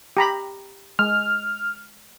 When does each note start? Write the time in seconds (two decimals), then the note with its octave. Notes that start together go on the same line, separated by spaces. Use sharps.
0.17 G4 A#5 B5
0.99 G#3 F6